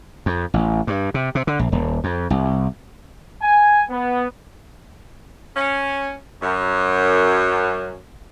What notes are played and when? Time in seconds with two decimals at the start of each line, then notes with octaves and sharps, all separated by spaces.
0.26 F2
0.54 A1
0.87 G2
1.14 C3
1.35 C3
1.47 D3
1.59 A#1
1.72 D#1
2.04 F2
2.30 C2
3.42 G#5
3.90 B3
5.55 C#4
6.41 F#2